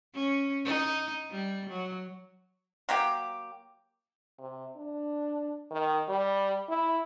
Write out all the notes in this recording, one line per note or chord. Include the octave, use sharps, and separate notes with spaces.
C#4
D#4
G3
F#3
F#3 A#3 G4
C3
D4
D#3
G3
E4